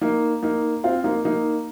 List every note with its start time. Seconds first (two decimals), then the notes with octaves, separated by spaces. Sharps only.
0.01 A#3 D#4
0.43 A#3 D#4
0.84 C4 F4
1.04 A#3 D#4
1.25 A#3 D#4